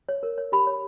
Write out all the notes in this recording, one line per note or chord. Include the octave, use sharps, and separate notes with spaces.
C#5
A#4
C#5
G4 B5
C#5